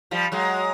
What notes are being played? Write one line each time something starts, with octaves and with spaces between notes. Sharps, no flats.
F3 G3
F#3 G#3